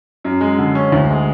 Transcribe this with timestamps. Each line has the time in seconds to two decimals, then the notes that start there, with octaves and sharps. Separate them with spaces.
0.24 F#2
0.41 G#3
0.58 D3
0.75 C#4
0.92 D2
1.10 G#3